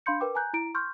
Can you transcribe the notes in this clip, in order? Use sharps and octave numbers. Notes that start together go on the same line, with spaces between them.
D4 F5 B5 C6 G6 C#7
A#4 B4 G5 D6
G#5 A#5 F#6 G6
E4 A#5 D7
C6 C#6 F6 G6